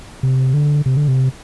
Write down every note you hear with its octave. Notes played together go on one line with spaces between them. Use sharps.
C3
D3
C3
D3
C3